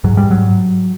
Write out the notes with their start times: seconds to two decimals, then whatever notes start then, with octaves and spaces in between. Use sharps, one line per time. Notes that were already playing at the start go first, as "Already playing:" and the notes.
0.04 G#2 F#3
0.17 G3
0.31 F#3